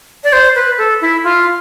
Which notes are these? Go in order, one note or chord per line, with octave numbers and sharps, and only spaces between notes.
D5
C5
B4
A4
E4
F4